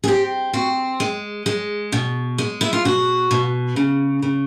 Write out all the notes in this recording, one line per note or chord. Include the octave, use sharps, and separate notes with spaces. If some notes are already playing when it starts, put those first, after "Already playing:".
G#4
C4 G4
C4 F#4
G#3
G#3
B2
G#3
E4
F4
B2 F#4
B2
C#3
C#3